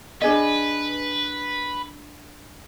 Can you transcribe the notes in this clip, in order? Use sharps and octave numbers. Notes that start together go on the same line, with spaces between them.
D4 G#4 B4 D#5